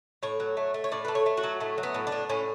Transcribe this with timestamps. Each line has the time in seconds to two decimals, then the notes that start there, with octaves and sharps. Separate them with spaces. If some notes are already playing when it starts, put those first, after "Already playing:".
0.23 A2 C#5
0.40 F#3
0.57 A3
0.74 A3
0.84 C#5
0.92 A2 D5
1.05 A3 B4
1.15 C#5
1.26 A3
1.37 F#4
1.44 F#3
1.60 A2 A3
1.78 F#3
1.83 B3
1.94 A2
2.07 D4
2.12 A2
2.29 A2 C#4